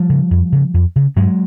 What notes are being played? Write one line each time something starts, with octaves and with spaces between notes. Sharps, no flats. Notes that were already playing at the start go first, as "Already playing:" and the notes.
Already playing: F3 G3
C#3
F2
C#3
F2
C#3
G2 F#3 G#3